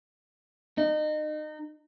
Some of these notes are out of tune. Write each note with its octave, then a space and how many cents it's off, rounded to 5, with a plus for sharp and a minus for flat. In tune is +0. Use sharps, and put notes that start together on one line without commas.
D#4 -30